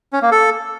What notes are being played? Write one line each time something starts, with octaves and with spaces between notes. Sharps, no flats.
C#4
A#3
A4